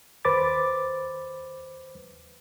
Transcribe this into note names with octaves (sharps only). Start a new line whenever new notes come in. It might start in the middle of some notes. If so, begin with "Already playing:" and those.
D#2 B4 C5 B5 D6 A6